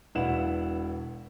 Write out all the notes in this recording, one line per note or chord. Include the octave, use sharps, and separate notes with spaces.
E1 E4 B4 F5 F#5 E7